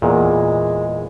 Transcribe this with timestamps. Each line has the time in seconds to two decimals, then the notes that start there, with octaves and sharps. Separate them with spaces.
0.02 E2 A#2 G#3